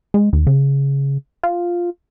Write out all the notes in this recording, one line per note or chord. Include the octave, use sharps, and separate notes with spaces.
G#3
D#2
C#3
F4